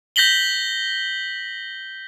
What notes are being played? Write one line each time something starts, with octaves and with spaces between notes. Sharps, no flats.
G6 A#6 B6 F#7 G7